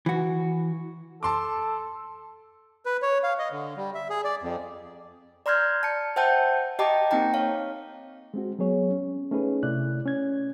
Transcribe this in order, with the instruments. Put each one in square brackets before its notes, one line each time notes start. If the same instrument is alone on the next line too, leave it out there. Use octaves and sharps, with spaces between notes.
[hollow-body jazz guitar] E3 F#4
[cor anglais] A4 [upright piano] A5 C6 D6
[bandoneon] B4
C#5
F5
D#5
D3
G3
E5
G#4
D5
F2
[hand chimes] D5 A#5 C6 F6 G6 G#6
A5 C#7
C5 E5 F#5 G5 A5 G6
G4 D#5 G5 A5 A#5 D6
A#3 C4 D#4 G5 A#5
C#5 F5
[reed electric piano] G#3 C4 F#4
F#3 B3 G#4 C#5
C#4
A3 C#4 D#4 G#4 B4
C3 A3 E4 D5 F#6
C#4 G#6